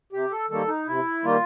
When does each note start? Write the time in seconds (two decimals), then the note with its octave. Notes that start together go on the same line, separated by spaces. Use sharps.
0.12 C3 G4
0.31 A4
0.49 D#3 G3 A#3 A4
0.67 D#4
0.86 C3 E4
1.23 D#3 G3 A#3 F4